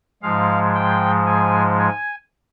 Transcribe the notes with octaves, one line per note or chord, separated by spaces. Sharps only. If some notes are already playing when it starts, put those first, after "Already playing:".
G#2 F3 G#3 F5
G5
G#5
G#5